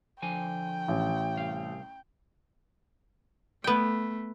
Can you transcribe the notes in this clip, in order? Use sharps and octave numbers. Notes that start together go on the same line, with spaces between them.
D3 F3 G5 G#5
A1
C2 F5
A3 B3 G5